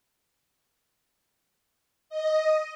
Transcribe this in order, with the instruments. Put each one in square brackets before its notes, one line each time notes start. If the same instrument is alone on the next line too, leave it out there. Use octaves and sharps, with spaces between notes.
[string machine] D#5